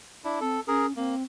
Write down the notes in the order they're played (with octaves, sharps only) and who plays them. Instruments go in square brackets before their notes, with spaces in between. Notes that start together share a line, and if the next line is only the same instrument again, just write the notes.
[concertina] D4 E4
[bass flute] C4 [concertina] A4
[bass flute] C#4 [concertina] G#4 A#4
[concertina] A#3 [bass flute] C4